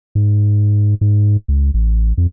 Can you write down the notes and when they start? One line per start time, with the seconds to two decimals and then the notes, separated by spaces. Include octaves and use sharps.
0.15 G#2
1.01 G#2
1.48 C#2
1.74 A1
2.18 F2